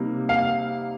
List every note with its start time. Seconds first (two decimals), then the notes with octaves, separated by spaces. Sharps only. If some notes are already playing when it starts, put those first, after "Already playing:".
Already playing: C3 G3 A#3 D#4
0.29 F5